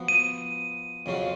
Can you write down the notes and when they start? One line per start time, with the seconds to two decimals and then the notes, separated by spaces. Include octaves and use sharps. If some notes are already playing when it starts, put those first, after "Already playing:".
Already playing: F3 B3 F#4
0.08 D#7
1.06 F2 C#3 F#3 C#4 F4